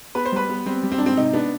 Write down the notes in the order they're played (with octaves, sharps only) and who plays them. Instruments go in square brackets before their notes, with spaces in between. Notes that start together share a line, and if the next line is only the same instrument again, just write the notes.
[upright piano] B3 B4
C5
G3 B4
B3
G3 C4
G3
C4
G#2 D4
C4
C3 D#4
B3 D4